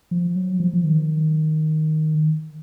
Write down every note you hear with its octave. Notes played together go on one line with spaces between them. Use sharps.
F3
F#3
F3
F3
D#3